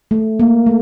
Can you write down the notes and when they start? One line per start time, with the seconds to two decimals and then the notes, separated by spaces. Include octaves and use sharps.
0.11 A3
0.40 A#3
0.66 A3